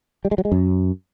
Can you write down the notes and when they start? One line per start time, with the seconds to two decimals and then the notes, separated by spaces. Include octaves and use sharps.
0.25 G3
0.31 G#3
0.38 F#3
0.45 G#3
0.52 F#2